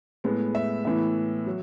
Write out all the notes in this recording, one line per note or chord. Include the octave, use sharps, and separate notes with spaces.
A2 G#3 B3
E5
A2 E3 B3 E5
F#3